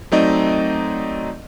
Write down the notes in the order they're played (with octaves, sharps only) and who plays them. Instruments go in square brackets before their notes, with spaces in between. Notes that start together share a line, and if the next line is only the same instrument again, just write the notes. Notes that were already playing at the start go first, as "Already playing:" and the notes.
[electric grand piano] F#3 A3 C4 D#4 D5 D#5